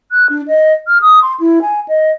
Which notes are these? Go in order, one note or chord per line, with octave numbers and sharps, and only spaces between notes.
F#6
D4
D#5
F6
D#6
C6
E4
G#5
D#5